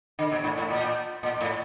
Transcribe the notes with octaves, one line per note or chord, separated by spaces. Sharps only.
D3
B2
A2
A2
A#2
A#2
A2